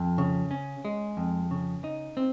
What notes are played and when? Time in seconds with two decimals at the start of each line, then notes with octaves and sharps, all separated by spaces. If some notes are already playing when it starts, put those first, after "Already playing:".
Already playing: F2
0.18 C#3
0.51 C#4
0.85 G#3
1.17 F2
1.51 C#3
1.84 D#4
2.17 C4